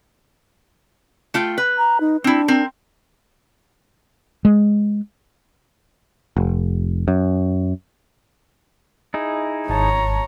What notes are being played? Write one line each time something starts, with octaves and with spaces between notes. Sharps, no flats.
A3 F4 G5
B4
A#5
D#4
C4 D4 E4
C4 A#4
G#3
F1
F#2
D#4 E4 G#4
G#1 C#5 A5 A#5